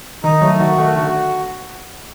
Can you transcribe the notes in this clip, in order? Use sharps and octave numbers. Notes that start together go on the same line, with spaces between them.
D#3 D#4
F#3 A3
D#3 F#4
D#3 A3
D3 F#4